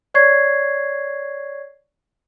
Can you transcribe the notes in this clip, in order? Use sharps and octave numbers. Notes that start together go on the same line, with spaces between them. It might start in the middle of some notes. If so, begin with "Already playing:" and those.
C#5 D5 C#6 G#6 C7